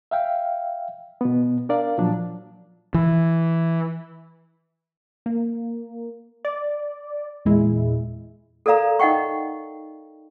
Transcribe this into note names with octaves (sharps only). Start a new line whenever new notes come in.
E5 F5 G5
B2 B3
D4 A#4 D5 F5
A#2 F3 F#3 D4
E3
A#3
D5
E2 A#2 G#3 E4
A4 A#4 D5 F5 A#5
D#4 D#5 F#5 G5 C#6